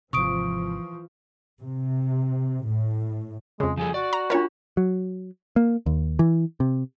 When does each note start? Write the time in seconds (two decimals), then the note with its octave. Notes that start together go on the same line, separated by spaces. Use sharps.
0.13 G#1 C3 E3 F3 C#6 D#6 D7
1.61 C3
2.65 A2
3.60 F2 C#3 G#3
3.78 F3 G3 G#4 A4
3.94 F#4 D5
4.13 A#5
4.30 D4 F4 A#4 C#5 B5
4.77 F#3
5.56 A#3
5.86 D#2
6.19 E3
6.60 C3